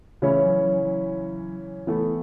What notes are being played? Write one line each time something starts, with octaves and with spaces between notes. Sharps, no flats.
C#3 E3 A3 C#4 E4 C#5
F#3
F#3
F#3
E3 A3 B3 E4